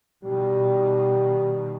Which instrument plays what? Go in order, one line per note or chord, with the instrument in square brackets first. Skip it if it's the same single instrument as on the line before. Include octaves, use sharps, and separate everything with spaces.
[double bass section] B2 D#3 [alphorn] G3